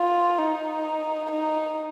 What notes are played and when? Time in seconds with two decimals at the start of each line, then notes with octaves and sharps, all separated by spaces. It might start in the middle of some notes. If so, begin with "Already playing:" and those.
Already playing: F4
0.39 D#4
1.31 D#4